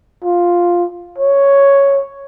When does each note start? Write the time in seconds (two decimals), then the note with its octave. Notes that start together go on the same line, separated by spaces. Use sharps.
0.24 F4
1.18 C#5